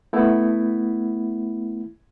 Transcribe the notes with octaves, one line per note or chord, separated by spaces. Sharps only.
A3 B3 E4